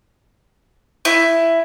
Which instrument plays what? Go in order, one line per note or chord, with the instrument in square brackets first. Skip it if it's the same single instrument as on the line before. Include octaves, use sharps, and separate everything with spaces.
[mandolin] E4